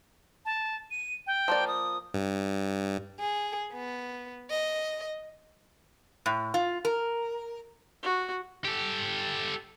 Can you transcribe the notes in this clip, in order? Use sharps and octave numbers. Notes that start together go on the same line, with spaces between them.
A5
D#7
G5
F3 A#3 D5
D#6
G2
G#4
B3
D#5
A2
F4
A#4
F#4
G4 A4